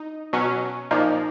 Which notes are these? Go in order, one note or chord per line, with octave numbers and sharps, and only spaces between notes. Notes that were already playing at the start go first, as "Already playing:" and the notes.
Already playing: D#4
B2 F#3 C#4
A#2 F3 A#3 D#4